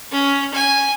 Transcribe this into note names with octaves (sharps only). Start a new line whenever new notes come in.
C#4
G#5